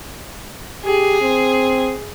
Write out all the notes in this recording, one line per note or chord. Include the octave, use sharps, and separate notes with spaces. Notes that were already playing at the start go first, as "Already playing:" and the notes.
G4 G#4
C4